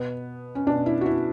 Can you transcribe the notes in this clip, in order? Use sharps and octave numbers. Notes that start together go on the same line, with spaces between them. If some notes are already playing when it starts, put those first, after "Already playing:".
Already playing: B2 B3
C#4
B2 D4
E4
F#4
E4